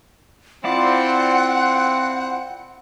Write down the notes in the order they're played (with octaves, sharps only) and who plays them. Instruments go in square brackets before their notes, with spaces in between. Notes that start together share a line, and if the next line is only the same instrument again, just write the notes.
[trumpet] C4 [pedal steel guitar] E4 F4 D5 [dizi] F#5